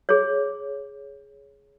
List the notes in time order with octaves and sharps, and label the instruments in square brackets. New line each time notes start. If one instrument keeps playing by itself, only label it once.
[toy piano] G#4 C#5